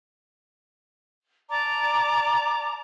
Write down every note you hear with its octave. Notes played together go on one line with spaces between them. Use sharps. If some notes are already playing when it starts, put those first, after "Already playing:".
D5 A5 A#5 D6